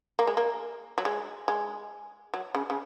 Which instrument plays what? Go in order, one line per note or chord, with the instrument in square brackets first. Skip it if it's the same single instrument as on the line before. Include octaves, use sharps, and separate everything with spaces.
[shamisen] A#3
G#3
A#3
F#3
G#3
G#3
F#3
C#3
C#3